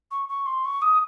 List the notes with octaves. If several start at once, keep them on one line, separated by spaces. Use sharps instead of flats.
C#6
C#6
C6
C#6
D#6